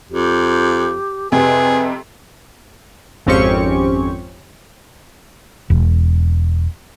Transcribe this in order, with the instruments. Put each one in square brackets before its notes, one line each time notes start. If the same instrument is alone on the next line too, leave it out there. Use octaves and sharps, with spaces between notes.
[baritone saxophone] F2 [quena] G4
[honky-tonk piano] F2 C3 G4 [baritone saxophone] G#4 [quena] B4
[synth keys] G#1 F2 C4 C#4 G4 C#6
[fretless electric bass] E1